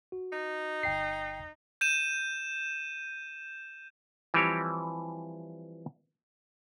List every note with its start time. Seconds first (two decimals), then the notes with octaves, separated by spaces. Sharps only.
0.12 F#4
0.32 D#4
0.83 G1 G5 C7
1.81 G6 D#7 E7
4.34 E3 F3 G3 C4 G4 C#5